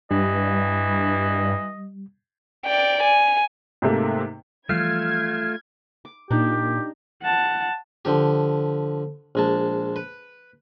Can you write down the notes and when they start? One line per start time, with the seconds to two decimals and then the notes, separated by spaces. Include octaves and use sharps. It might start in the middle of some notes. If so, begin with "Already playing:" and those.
0.11 G2 E3 G3 D#5
2.66 D5 G5
3.03 G#5
3.82 G#2 C3 A3 A#3
4.69 E3 F3 G3 A3 F4 F6 G#6
6.05 D6
6.31 A#2 D4 D#4 G4
7.23 F#5 A5
8.05 D3 F3 G4
9.35 A#1 G#3 A5
9.96 B4